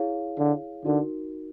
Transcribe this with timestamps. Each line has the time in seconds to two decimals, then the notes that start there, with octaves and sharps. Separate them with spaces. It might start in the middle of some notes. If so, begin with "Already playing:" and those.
Already playing: E4 G#4 C#5 F5
0.38 D3
0.85 D3 D#4 F#4 A#4